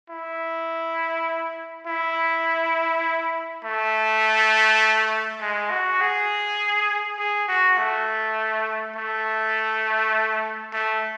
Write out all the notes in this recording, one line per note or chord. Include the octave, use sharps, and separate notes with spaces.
E4
E4
A3
G#3
F#4
G#4
G#4
F#4
A3
A3
A3